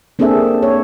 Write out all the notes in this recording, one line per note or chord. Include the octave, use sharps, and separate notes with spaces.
A#3 C4 D4 G#4 A4 E5
C#5